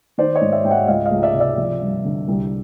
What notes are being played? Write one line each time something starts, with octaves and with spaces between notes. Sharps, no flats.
D#3 C5 D5
C#5 D#5
G#2
D5 E5
G#2 G5
E5 F#5
C#2 D#5 F5
D#5 F5
C#2
D5 E5
C3
D5 E5
F3
G2
D3
C2